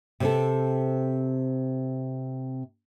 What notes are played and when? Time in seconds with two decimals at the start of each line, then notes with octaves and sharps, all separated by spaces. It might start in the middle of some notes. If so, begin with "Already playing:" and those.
0.20 C3 C4 A4